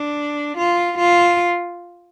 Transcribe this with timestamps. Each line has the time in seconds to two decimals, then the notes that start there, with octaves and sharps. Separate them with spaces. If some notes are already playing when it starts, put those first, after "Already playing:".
Already playing: D4
0.57 F4
0.98 F4